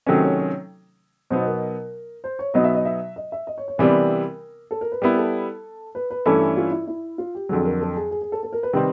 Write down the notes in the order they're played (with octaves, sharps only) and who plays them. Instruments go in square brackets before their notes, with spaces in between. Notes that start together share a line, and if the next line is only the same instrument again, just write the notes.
[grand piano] C3 D#3 F#3 A3 C#4 [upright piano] C5
[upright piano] C#5
C#5
[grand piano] B2 F#3 B3 D#4 [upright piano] C5
[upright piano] A#4
C5
C#5
[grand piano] B2 F#3 B3 D#4 [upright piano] D#5
[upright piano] E5
D#5
E5
D#5
E5
D#5
C#5
C#5
[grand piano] C3 E3 G3 B3 D4 [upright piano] A#4
[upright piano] A4
A#4
B4
[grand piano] G3 B3 E4 [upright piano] A#4
[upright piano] A4
B4
B4
[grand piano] G2 E3 A3 C#4 E4 [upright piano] A4
[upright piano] F4
E4
E4
F4
G4
[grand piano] F2 D3 F#3 [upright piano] G#4
[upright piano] A#4
A4
G#4
G#4
G#4
A4
A4
A#4
B4
[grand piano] C3 D#3 G3 C4 [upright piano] B4